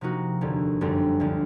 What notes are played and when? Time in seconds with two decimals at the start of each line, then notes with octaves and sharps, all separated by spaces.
0.01 C3 F3 A#3 D#4 F#4
0.41 F1 D#2 D3
0.81 G1 F#2 D3 G3 C4
1.20 D2 D3 F3